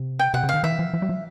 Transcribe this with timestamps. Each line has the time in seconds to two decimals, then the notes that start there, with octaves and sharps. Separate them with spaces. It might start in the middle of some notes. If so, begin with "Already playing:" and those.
Already playing: C3
0.19 G5
0.34 C3 F#5
0.44 C#3
0.49 F5
0.54 D#3
0.63 E3 E5
0.79 F3
0.93 F3
1.02 G3
1.09 F#3